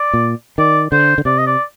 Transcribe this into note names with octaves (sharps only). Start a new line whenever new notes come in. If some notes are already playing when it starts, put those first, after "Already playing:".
Already playing: D5
A#2
D#3 D5
D3 C5
D3
C3 D5
D#5
D5